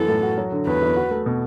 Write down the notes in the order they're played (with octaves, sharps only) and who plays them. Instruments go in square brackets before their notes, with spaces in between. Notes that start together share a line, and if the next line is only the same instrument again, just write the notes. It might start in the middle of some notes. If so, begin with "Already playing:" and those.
Already playing: [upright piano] F#2 E3 B3 [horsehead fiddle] A4
[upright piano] A2
F#4
F#3
D3
[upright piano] E2 [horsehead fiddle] B4
[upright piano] E2
F#4
A3
B2